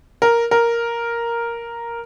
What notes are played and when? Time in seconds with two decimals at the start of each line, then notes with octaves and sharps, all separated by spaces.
0.22 A#4
0.51 A#4